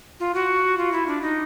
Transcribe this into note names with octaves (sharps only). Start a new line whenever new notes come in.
F4
F#4
F4
E4
D4
D#4